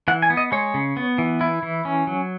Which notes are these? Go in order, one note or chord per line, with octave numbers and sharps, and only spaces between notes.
E3 F#5
G#5
B3
D#5
G#3 C#5
C#3
B3
E3
E4
E3
C#4
F#3